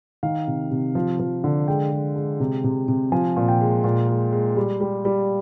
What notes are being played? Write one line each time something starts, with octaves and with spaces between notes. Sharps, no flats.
D#3 F5
C3
C3
F3
F3
D3
G#3 G5
G#3
G#3
C3
C3
C3
F3 G#5
A#2
G5
G#3
A#2
G#3
G#3
G3
G3
G3